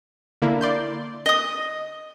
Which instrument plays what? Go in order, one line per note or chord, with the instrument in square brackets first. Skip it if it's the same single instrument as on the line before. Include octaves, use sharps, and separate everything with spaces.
[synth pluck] D3 A#3 E4
D5 C6 G6
[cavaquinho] D#5 D#6